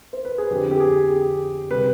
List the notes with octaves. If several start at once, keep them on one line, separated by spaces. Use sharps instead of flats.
C5
B4
G#4
F2 D3 F3 G4
G4
G#4
G#4
C3 G3 B4